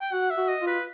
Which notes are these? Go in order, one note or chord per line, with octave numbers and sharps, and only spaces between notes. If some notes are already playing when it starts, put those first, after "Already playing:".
G5
F#4 F#5
E5
F#4
D#5
F4
B4